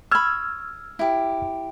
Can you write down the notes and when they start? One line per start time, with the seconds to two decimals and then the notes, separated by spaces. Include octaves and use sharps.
0.11 B5 C#6 E6 F6 G#6
0.99 E4 G4